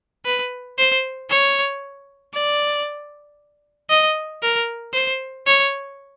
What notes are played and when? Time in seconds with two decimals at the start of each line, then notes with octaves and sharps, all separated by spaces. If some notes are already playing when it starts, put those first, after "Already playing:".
0.26 B4
0.78 C5
1.30 C#5
2.34 D5
3.90 D#5
4.43 A#4
4.94 C5
5.47 C#5